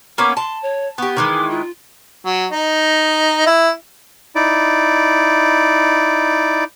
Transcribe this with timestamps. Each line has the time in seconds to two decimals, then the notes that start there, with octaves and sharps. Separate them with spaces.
0.18 A#3 B3 C#4 D6
0.37 A5 C6
0.62 C#5
0.98 B3 G4 C#6
1.17 D#3 E3 G#3 D6
1.49 F4
2.25 F#3
2.52 D#4
3.47 E4
4.35 D#4 E4 D5